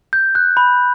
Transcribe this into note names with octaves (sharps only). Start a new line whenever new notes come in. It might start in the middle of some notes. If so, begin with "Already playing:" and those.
G6
F#6
B5